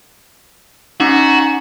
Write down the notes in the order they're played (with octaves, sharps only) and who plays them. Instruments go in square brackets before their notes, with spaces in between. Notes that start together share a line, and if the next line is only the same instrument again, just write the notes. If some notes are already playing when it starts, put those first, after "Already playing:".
[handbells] C#4 D#4 [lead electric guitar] F#4